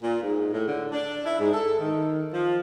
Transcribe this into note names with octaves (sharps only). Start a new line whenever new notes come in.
A#2
G#2
A2
D3
D4
E4
G#2
A4
D#3
F3